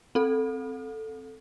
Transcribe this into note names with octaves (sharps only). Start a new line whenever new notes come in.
C4 A4